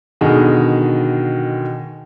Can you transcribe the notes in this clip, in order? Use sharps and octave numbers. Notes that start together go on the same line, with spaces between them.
B2 D3 D#3 G#4